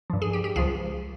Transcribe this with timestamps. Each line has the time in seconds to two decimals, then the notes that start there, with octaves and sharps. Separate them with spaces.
0.10 G2 F3
0.22 G#4
0.33 G4
0.44 G4
0.56 C#2 C#3 F3 G#4